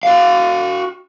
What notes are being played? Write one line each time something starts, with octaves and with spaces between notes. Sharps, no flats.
F#4 F5